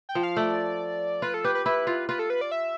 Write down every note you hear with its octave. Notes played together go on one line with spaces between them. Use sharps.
G5
F3
F5
A3 D5
F4 B4
A4
G4 B4
B4
E4 B4
F4
F4 B4
A4
B4
D5
E5